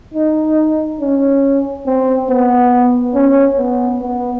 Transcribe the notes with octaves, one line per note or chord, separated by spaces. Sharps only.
D#4
C#4
C4
B3
C#4
B3
B3